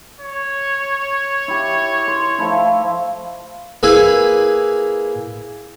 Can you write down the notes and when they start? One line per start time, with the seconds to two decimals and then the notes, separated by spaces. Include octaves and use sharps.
0.20 C#5
1.48 E4 G4
2.07 C6
2.38 F3 A3 E4
3.83 A#3 E4 G#4 B4